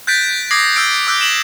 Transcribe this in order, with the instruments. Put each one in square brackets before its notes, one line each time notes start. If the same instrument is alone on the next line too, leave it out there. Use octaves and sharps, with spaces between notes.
[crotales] F#6 G6 A6 B6 D7
D6 D#6 G#6 A#6 C7
E6 G6 D7
D6 E6 F#6 G6
E7 F#7